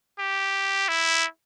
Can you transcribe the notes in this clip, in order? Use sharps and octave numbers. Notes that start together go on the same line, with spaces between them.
G4
E4